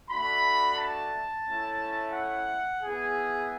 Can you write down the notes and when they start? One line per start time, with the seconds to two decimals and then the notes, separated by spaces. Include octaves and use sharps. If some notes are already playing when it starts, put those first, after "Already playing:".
0.11 A3 D4 F#4 B5
0.78 A5
1.46 A3 C#4 E4
2.14 F#5
2.81 B3 E4 G#4